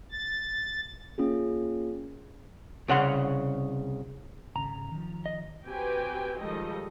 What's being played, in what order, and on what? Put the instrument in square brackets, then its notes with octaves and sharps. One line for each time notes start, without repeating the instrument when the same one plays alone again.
[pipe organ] A6
[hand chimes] A#3 C#4 F4 G#4
[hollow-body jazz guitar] C2 C#3 F#5 C6
[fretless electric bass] G#1 C#3 [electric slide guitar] A#5
[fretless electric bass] D#3 F3
[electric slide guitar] D#5
[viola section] C4 F#4 G4 B4 G5 G#5
D#3 F3 G3 G#3 A4 D#5